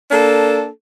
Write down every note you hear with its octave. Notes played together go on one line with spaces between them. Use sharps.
A#3 D4 A4